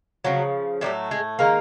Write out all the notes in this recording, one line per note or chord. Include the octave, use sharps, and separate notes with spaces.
C#3 F3 F#3 F#4
A2 F#3 G3 A3 G4
G#3 G#4
D#3 G#3 A#3 A#4